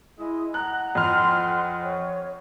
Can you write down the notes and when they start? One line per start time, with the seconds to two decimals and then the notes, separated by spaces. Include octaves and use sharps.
0.18 G#3 E4 D#5
0.54 F#5 A#5 F#6
0.95 F2 C6 F6
1.83 C#5